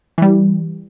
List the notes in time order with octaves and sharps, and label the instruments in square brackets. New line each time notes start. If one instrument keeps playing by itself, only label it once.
[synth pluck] E3 G3